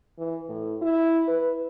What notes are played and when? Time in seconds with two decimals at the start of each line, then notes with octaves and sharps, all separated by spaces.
0.18 E3
0.49 A2
0.82 E4
1.27 B4